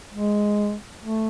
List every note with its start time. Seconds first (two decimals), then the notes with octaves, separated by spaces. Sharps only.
0.12 G#3
1.01 A3